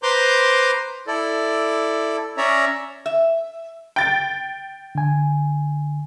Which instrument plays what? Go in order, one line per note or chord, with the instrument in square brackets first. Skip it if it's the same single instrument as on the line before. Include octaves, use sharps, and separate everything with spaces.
[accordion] B4 C5 A#5 C6 D6 G6
E4 A4 D5
C#4 C#5 D5 E5 A#5
[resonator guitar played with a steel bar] E5
[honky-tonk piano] G5 A6
[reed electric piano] D3 G#5